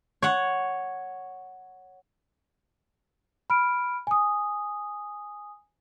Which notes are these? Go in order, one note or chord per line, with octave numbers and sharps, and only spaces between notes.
C#5 F#5
B5 F6 D7
G#5 D#6